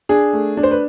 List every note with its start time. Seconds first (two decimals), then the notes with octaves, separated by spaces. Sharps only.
0.09 D4 G#4
0.33 A3
0.57 D4
0.63 C5
0.71 B4